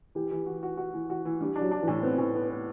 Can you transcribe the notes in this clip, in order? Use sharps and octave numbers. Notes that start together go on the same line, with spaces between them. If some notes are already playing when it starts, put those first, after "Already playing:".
E3 G4
E3
F#4
F#4
F#4
E3
F#4
E3
G3 D4
D4
F#3
D4
E3
A2
B3 C4
A2
B3
B3